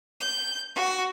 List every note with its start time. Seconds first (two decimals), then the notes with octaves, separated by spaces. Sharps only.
0.20 G6
0.75 F#4